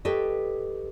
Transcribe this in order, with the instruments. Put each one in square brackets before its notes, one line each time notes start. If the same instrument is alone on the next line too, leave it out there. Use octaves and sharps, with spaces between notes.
[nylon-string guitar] G4 A4 B4 C#5 D#5